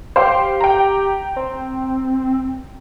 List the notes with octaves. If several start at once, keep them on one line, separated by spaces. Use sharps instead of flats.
G4 C5 F5 G5
G5 A#5
C4